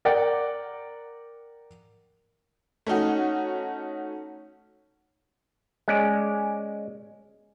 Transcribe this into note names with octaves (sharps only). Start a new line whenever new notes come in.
A#4 D5 F#5 G5
A3 C#4 D#4 F#4
G#3 C#4 D5